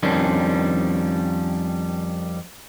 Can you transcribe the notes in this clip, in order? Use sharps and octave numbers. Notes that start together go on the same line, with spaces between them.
F2 D#3 G3 C#4 D4